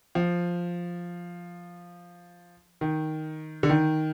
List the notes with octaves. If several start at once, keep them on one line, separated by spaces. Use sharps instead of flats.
F3
D#3
D3
D#3